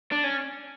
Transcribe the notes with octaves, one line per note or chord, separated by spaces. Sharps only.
D4
C#4